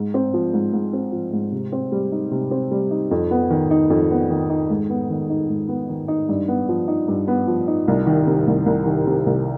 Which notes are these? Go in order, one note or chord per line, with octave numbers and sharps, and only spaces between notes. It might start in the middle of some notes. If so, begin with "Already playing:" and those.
Already playing: G#2
C4
F3
G#2
G#2
C4
F3
G#2
C3
C4
G3
D#4
C3
C4
G3
D#4
F2
B3
D#3
D#4
F2
B3
D#3
D#4
G#2
B3
D#3
D#4
G#2
B3
D#3
D#4
G2
B3
F3
D#4
G2
B3
F3
D#4
C2
D#3
C3
C2
C2
D#3
C3
C2